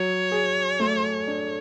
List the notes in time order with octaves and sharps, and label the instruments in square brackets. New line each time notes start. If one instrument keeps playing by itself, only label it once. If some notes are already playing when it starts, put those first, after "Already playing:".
Already playing: [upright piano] F#3 [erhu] C#5
[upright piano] G#4
A3
D4